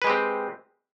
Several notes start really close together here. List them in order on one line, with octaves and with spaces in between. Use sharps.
B4 G#3 G4 C4